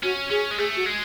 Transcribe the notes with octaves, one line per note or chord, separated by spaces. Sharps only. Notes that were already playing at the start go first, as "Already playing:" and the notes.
C#4 F#4
C#4 G#4
G#3
A3 G#4
F#4
G#3